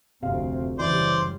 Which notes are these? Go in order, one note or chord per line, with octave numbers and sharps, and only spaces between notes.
F1 D2 C3 C4 F5
F#2 C#3 E3 G3 C5 D5